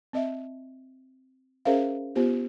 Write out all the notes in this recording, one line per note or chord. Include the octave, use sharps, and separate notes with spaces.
C4 D#5 E5
C#4 G#4 A#4 C5 E5 F5
B3 F4 G4 C5